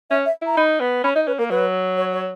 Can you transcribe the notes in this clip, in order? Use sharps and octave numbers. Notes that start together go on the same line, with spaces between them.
C#4 E5
E5
E4
A#5
D#4 B5
B3
C#4 B5
D#4 D#5
C#4 B4
A#3 A#4
F#3 B4
C#5
C#5